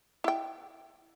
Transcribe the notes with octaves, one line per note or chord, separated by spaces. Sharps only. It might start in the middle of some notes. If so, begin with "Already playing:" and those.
E4 G5